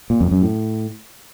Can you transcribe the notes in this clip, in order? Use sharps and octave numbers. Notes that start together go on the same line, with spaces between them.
A#2
F2
F#2
A2